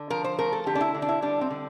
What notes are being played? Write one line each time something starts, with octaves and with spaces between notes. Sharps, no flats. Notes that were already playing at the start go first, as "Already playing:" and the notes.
Already playing: D3
F3 A#4
C5
A3 A#4
A4
D3 G4
D4
E4
D3
D4
E4
G3 D4
C4
D3